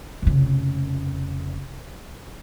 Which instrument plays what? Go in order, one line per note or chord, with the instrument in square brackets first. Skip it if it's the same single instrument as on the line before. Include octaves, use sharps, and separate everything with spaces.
[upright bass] F1 C#3